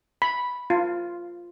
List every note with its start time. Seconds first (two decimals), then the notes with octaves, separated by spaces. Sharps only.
0.22 B5
0.70 F4